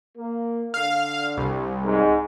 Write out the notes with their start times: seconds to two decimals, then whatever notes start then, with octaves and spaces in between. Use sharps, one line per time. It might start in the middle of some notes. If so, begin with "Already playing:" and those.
0.17 A#3
0.74 D3 F5
1.37 C2
1.84 G#2